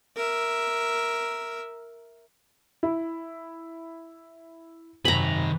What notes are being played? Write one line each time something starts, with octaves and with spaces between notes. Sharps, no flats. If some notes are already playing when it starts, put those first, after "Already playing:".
A#4 E5
E4
F#2 C3 D#3 G#5 A#5 B5